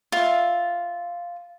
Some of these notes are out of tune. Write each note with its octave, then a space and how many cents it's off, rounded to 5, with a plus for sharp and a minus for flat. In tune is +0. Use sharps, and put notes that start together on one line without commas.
F4 +0 E5 +0